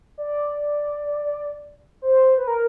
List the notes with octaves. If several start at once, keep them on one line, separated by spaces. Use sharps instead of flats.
D5
C5
B4
A#4